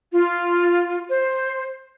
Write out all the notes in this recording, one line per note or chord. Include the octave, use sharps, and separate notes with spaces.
F4
C5